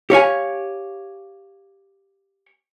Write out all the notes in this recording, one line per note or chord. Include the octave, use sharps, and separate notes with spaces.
G4 C#5 F5 G#5